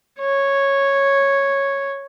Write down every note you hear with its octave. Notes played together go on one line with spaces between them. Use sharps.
C#5